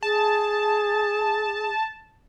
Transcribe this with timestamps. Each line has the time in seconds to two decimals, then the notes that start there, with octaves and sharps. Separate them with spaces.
0.03 G#4 A5